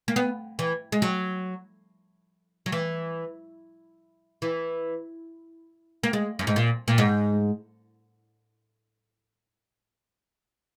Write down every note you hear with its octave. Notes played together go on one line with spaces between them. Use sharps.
A#3
B3
E3
G#3
F#3
F#3
E3
E3
A#3
G#3
F#2
G#2
A#2
A#2
G#2